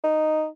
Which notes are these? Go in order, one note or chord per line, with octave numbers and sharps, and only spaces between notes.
D#4